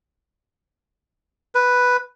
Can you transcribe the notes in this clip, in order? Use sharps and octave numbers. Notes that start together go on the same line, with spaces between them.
B4